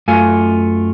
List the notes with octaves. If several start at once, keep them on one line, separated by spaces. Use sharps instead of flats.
F#2 A3 F4 G#5